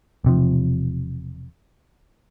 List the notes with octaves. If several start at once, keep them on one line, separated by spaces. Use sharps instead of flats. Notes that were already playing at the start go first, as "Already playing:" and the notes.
E1 C3 F3